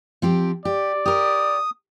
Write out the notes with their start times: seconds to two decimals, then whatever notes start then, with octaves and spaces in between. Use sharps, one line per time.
0.22 F3 C4 G4
0.65 G4 D5
1.06 G4 A#4 D#6